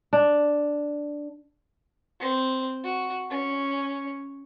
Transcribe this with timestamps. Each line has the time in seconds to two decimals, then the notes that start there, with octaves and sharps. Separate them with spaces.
0.13 D4
2.20 C4
2.84 F#4
3.30 C#4